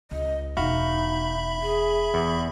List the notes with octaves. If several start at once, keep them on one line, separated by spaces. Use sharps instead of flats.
C#2 D#5
E1 D#4 F#4 E5 F5 B5
G#4
E2